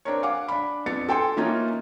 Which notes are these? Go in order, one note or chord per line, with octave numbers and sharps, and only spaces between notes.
C4 D4 A#4 C#5
F5 F#5 G#5 D6
D4 B5
F2 B3 D4 A6 C#7
A4 G5 G#5 C6
E3 A#3 C#4 D#4 F4